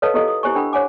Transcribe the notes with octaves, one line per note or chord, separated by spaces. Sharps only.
A4 B4 C#5 D#5 F5 A5
E4 F4 G4 A4 D#5 F5
D#6
E4 G4 C5 G#5 C#6
D4 A4 F#5 G5 B5 E6
C5 C#5 F#5 G#5 D6